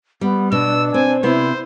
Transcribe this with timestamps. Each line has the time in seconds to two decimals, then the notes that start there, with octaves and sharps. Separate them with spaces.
0.21 G3 B3
0.52 B2 D4 E6
0.94 C4 G#5
1.23 C3 B3 E4 C5